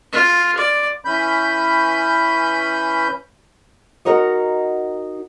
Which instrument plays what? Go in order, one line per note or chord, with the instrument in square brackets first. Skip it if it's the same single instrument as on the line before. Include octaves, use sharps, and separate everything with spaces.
[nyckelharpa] F4
D5
[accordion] E3 C#4 B5 G6
[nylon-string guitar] D#4 F#4 A#4 C#5 D#5